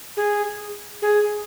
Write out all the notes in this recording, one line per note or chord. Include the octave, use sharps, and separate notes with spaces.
G#4
G#4